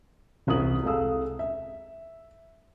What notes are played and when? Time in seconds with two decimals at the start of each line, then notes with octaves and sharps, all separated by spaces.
0.47 E1 C2 F4 D#6 F#7
0.83 C2 G#3 A4 F5 D#6 E6
1.39 E5